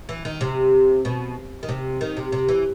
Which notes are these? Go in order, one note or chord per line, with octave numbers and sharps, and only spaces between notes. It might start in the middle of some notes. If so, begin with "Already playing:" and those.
E3
D#3
C3
B2
D#3
C3
D#3
C3
C3
E3